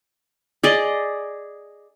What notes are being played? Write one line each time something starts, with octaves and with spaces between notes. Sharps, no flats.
G#4 D5 D#5